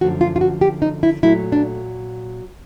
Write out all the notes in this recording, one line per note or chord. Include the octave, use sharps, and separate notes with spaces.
F#2 D3 F3 A3 F#4
F4
F4
F#4
G4
D#4
E4
A#2 F#3 A3 E4
D4